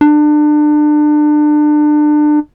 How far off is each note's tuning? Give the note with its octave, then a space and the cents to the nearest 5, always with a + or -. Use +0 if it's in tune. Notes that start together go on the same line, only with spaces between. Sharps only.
D4 +30